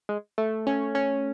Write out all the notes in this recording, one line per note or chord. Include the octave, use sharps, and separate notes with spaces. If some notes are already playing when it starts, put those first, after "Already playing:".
G#3
A3
C#4
C#4